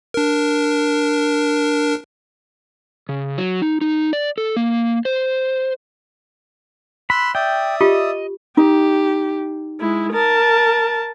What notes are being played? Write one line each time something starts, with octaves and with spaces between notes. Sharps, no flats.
D4 A#4
C#3
F#3
D#4
D#4
D5
A4
A#3
C5
B5 C6 E6 F#6
D5 E5 G5 D#6
F4 G4 D#5
D#4 G4
G#3 E4
A#4 A5